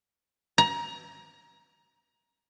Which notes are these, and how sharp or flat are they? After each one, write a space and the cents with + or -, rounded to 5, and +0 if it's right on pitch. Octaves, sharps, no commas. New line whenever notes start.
A#5 +25